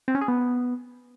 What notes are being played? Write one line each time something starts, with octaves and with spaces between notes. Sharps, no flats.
C4
C#4
G#4
B3